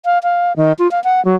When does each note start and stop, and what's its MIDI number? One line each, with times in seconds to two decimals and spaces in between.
0.05 0.19 77
0.23 0.53 77
0.57 0.72 51
0.79 0.90 65
0.91 1.02 77
1.04 1.23 78
1.25 1.36 54